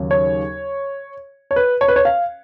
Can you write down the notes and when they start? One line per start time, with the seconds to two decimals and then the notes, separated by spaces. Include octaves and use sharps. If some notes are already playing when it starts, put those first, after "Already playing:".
Already playing: D#2 C#3 F#3
0.11 C#5
1.51 C#5
1.56 B4
1.81 C#5
1.88 B4
1.96 C#5
2.05 F5